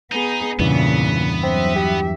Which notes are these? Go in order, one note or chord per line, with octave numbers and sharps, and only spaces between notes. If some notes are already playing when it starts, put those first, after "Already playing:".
B3 D#4 G#4
E2 G2 A#2 C#3 E3 B3
F#3 C4 E5
G4